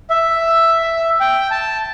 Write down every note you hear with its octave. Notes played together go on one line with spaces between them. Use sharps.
E5
G5
A5